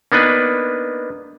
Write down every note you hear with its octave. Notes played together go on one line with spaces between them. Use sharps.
A#3 B3 D4 D#4 B4